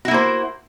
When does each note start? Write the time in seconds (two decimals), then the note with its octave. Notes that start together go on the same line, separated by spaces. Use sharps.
0.05 F#4
0.08 E4
0.11 A#3
0.14 C5